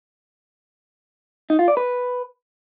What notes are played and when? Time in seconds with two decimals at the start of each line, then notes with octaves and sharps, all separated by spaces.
1.50 D#4
1.59 F4
1.68 D5
1.77 B4